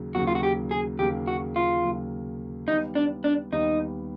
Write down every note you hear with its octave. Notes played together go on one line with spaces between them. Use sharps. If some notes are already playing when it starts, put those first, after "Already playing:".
Already playing: D#2 C#3 F#3 A#3
D#2 C#3 F#3 A#3 F#4
F4
F#4
G4
G#4
D#2 C#3 F#3 A#3 G4
F#4
F4
D#2 C#3 F#3 A#3
D#2 D#3 G3 B3 D#4
D4
D4
D#2 D#3 G3 B3 D#4